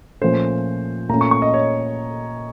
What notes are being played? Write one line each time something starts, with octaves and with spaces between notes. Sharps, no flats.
A#2 F3 A3 C#4 C5
A#2 A3 C#4 A#5
C#6
C#6
D#5
C#5